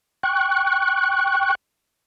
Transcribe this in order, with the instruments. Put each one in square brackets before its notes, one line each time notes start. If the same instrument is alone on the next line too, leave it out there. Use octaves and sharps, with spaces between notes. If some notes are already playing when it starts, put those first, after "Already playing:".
[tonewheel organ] G5 C#6 F#6